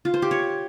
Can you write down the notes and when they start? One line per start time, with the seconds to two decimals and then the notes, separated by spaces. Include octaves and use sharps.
0.05 F4
0.14 C5
0.22 G4
0.31 C#5